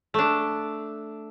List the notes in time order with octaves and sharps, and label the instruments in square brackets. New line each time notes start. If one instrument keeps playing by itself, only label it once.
[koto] A3 D4